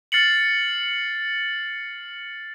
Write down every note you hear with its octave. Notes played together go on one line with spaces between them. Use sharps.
F6 A6 C7 C#7 F#7